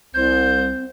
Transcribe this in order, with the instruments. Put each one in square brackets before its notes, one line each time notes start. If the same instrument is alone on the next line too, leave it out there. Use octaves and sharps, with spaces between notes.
[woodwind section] C2 [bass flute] C4 [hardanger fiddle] C5 [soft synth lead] G6